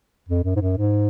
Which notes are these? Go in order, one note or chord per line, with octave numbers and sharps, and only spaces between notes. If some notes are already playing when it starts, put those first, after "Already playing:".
F2
F#2
G#2
F#2
G#2